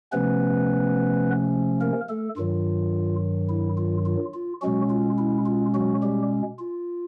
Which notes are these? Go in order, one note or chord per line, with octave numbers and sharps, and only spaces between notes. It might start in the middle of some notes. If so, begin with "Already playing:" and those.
C3 F3 A3 B3 C#4 B4
A#3 A#4
A3 A4
G2 D#3 F#3 F4
E4
F4
F4
F4
B2 F#3 G#3 C#4 F#4
F4
E4
F4
F#3 F#4
G3 G4
F4